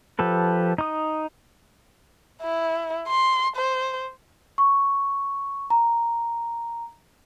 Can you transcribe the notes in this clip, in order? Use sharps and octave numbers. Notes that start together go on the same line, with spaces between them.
F3 G4 A4 B4
D#4 D#6
E4
C6
C5
C#6
A#5